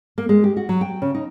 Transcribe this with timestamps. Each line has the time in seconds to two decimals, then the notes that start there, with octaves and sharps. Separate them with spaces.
0.18 A#3
0.29 G#3
0.44 G4
0.56 F#4
0.69 F#3
0.81 G5
1.02 C#3
1.14 D#4